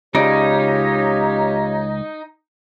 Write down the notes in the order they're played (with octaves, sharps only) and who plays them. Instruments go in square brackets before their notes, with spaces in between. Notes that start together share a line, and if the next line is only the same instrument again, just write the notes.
[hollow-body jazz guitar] C#2 C#3 D5 [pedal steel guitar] D#4 [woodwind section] F4 G4 C#5